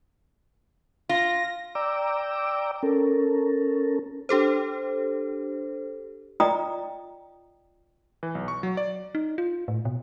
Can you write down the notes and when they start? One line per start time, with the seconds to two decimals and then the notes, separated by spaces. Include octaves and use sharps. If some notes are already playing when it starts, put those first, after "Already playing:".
1.09 F4 A#6
1.75 D5 G5 A#5 D6 E6
2.83 C#4 A4 A#4
4.29 D4 G4 A4 C5
6.40 F4 D5 D#5 G5 A#5 D#6
8.23 E3
8.35 B1
8.48 C#6
8.63 F#3
8.77 D5
9.15 D#4
9.38 F4
9.68 A2
9.85 B2